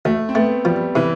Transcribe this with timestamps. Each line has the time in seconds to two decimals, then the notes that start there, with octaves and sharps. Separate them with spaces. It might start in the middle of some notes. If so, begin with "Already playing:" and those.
0.05 D2 A3
0.29 C4
0.35 A3 B3
0.65 F3 G3
0.95 C3 E3